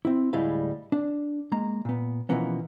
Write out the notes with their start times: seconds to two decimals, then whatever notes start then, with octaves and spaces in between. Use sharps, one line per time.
0.05 C4 E4
0.33 D2 A2 G3 G#3 E4 F5
0.92 D4
1.52 G#3 A#3 A#5
1.85 A#2 B3
2.29 B2 E3 F3 A#3 B3 C#4